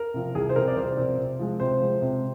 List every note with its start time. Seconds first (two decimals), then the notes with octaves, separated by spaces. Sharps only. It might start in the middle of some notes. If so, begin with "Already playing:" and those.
Already playing: A#4
0.14 C3 F3 C4
0.35 C2 G#4
0.49 C5
0.56 C3 F3 C4 A#4
0.68 D5
0.76 C2 C5
0.97 C3 F3 C4
1.18 C3
1.39 F3 G#3
1.60 C3 C5
1.81 F3 G#3
2.02 C3